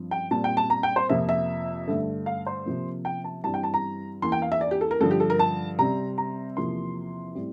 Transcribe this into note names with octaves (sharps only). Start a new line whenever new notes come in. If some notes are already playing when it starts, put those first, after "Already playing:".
Already playing: G2 F3 C4
G5
A#2 G3 C4 A5
G5
A5
A#5
G5
C5
F2 C3 F3 A#3 E5
E5
G2 D3 A3
F5
C5
C3 F3 A#3
G5
A5
G2 E3 G3 C4 A5
G5
A5
A#5
E2 E3 A#3 C6
G5
F5
E5
D5
G4
A4
A#4
G2 D3 F3 A4
G4
A4
A#4
A5
C3 G3 C4 A#5
A#5
E2 C3 F3 A#3 C6
A2 G3 C4